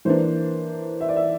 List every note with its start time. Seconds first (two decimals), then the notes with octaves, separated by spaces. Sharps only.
0.05 E3 A#3 D4 C5
1.01 E5
1.08 D5
1.16 E5